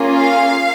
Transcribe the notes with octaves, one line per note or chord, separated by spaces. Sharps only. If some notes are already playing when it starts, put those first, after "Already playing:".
Already playing: A#3 C#4 F4 G#4
F5